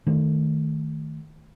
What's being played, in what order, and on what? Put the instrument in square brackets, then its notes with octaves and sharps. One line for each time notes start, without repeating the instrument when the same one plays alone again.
[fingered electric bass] D#3 A3